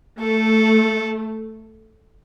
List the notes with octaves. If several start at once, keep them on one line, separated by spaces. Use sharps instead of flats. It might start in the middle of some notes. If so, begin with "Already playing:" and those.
A3 A4